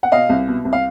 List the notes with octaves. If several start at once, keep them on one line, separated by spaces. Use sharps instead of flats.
F#5
B2 D#5 F5
C2
B2
C2
F5